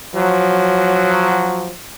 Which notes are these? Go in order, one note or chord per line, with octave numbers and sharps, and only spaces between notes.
F3 F#3